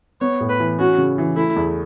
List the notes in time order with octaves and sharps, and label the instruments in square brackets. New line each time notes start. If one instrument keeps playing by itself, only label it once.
[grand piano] B3 [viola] C#5
[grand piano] A2
[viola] B4
[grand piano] E3
[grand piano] C#4 [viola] F#4
[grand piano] C#3
E3
[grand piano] A3 [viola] E4
[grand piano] E2